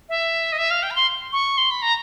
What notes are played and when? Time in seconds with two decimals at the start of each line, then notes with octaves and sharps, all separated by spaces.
0.09 E5
0.52 D#5
0.58 E5
0.71 F5
0.83 G5
0.91 B5
0.96 C6
1.33 C#6
1.58 C6
1.71 B5
1.82 A#5